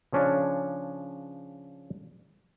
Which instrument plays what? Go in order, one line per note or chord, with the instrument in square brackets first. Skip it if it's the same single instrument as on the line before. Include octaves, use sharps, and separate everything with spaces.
[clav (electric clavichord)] C#3 F3 C#4 D4